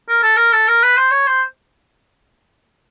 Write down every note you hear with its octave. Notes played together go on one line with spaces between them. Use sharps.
A#4
A4
A#4
A4
A#4
B4
C5
C#5
C5